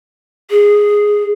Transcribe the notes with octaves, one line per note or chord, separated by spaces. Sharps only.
G#4